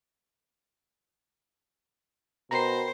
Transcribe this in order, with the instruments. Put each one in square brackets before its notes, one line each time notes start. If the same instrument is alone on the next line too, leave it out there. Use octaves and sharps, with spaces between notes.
[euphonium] B2 [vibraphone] A#4 G5 B5 [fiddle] C5 [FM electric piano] A#5 C7